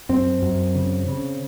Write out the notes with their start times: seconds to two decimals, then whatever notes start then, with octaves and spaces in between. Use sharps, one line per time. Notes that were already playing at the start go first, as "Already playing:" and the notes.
0.09 F#2 C4
0.42 F#2
0.75 C#3
1.08 C#3